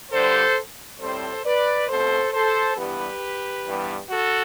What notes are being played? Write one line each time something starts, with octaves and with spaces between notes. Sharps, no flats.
G2 D3 G3 A4 C5
A2 G3 C4 A4 C5
B4 D5
B2 A3 C4 A4 C5
A4 C5
G2 E3 G3 B3 G4 B4
G2 E3 G3 B3
F#4 A4